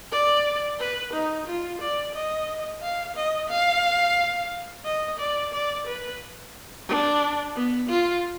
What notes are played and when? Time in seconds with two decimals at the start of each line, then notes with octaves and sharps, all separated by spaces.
0.12 D5
0.79 B4
1.13 D#4
1.47 F4
1.81 D5
2.14 D#5
2.82 F5
3.16 D#5
3.50 F5
4.85 D#5
5.19 D5
5.53 D5
5.87 B4
6.88 D4
7.55 B3
7.89 F4